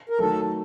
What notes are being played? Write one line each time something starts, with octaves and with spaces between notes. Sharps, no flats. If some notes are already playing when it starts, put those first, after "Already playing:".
A#4
D#3 F#3 A3 A4